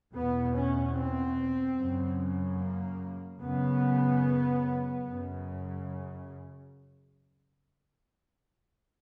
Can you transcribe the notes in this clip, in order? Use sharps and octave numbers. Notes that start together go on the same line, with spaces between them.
E2 B2 B3
C#4
C4
F#2 C#3
A#3
F#2 C#3 B3
F#2 C#3